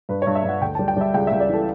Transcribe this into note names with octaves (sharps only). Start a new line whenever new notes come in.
G2 B4
C#5
G2
E5
G2 F#5
D2 G5
G3 A5
G5
G3 E5
C#2 G5
E5
C#2
D5
E3 A4